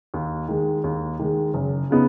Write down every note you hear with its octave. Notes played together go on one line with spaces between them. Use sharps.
D#2
D#3 G#3
D#2
D#3 G#3
F#1
C#3 B3 D#4